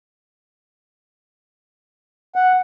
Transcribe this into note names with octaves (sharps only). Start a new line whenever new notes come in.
F#5